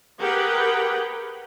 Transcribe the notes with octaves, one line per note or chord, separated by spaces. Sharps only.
G4 G#4 A#4 B4 F#5 G5